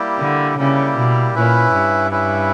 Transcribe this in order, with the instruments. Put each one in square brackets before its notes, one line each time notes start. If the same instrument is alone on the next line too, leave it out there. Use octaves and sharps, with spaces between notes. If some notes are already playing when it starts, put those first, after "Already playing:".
Already playing: [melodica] G3 A#3 E4 G4
[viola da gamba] D3
[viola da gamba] C#3 [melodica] G3 A#3 E4 G4
[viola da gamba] B2
[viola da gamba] A#2 [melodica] C#4 E4 B4 E5
[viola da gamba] G2
[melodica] C#4 E4 B4 E5